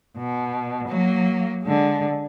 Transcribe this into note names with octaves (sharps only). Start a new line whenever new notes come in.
B2
F#3 A#3
D3 G#3